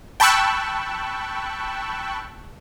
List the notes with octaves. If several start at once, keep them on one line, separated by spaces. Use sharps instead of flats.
G5 A5 B5 C#6 E6 F#6